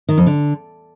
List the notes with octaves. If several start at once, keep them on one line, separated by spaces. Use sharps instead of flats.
D#3
F2
D3